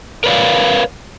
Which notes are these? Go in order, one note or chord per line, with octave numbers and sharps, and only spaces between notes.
A#4 B4 C#5 D5 F5